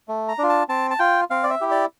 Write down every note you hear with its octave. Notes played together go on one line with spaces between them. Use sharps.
A3
A#5
D4 F4
A5
C4 A5
A5
F4 G5
C4 F5
D5
E5
E4 G4
D5